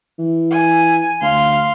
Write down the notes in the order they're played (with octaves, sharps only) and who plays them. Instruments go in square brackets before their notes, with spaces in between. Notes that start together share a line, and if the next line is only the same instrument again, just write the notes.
[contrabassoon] E3
[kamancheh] G#5
[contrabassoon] D2 [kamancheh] F5 C6